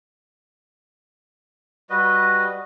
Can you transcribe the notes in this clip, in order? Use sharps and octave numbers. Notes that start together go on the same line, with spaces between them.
G3 F#4 B4 D#5